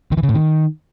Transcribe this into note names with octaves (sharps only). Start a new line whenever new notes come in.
D#3
E3
C#3
A2
D#3